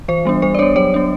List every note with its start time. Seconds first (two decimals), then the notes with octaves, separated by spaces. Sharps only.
0.08 E3 C5
0.25 G3 B3 D4
0.42 G3 C5
0.55 D5
0.59 B3 D4 C#5
0.76 F#3 C#5
0.94 B3 D4